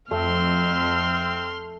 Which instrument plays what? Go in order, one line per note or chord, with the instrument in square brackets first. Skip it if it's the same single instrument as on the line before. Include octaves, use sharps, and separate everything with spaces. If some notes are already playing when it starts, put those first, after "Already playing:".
[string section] F2 [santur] A3 [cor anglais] C4 [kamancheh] C6 F6